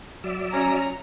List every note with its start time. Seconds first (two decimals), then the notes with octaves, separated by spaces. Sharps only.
0.24 F#3 D5 E5
0.53 C#4 A#5